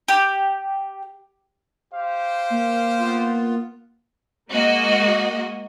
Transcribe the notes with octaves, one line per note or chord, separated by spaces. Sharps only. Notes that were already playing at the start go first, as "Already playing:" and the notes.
G4
G4 C5 F5
A#3
B3 F4
G#3 A#3 F#4 D#5